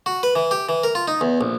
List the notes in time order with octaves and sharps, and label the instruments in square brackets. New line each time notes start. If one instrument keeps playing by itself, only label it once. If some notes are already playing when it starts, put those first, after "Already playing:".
[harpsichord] F#4
B4
E3
G4
E3
A#4
F4
D#4
E2
A#1